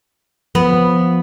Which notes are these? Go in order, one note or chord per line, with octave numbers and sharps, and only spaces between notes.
F3 B3